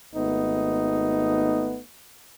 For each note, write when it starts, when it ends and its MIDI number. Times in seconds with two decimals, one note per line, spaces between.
0.14 1.80 32
0.14 1.80 57
0.14 1.80 59
0.14 1.80 63